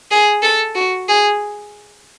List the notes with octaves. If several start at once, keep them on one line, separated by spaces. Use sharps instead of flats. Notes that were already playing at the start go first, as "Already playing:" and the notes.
G#4
A4
F#4
G#4